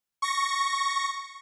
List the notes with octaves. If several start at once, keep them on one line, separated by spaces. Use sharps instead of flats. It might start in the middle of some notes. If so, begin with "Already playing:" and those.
C#6 A#6